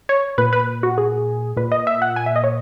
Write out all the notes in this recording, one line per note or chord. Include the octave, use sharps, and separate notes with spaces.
C#5
A#2 B4
B4
F#4
G#4
A#2 B4
D#5
E5
F#5
G#5
E5
D#5
C#5